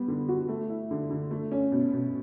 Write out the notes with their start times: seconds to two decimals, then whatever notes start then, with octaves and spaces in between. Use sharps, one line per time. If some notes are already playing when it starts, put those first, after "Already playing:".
Already playing: G3 B3
0.08 D3
0.29 F#4
0.49 A3
0.70 E4
0.91 D3
1.10 D3
1.31 A3
1.51 C#4
1.72 B2
1.93 B2